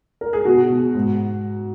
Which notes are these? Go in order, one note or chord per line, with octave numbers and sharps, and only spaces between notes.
A#4
G#4
B2 F#4
B2
G#2